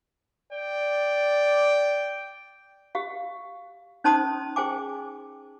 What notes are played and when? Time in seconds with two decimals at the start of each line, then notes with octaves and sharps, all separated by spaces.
0.53 D5 G5
2.95 G4 F5
4.04 C#4 D#4 C5 A5 C6 D#6
4.56 G#4 C5 G5 G#5 D6